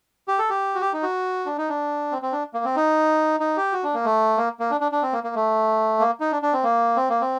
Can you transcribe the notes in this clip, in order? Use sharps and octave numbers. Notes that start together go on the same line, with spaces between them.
G4
A4
G4
F#4
G4
D#4
F#4
D4
D#4
D4
C4
C4
D4
A#3
C4
D#4
D#4
G4
F#4
D4
A#3
A3
A#3
A#3
D4
D4
D4
C4
A#3
A#3
A3
A#3
D#4
D4
D4
C4
A#3
C4
A#3
C4